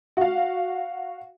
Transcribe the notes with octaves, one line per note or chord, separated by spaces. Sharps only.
F#4 F5